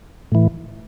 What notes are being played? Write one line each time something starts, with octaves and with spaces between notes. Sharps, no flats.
A2 E3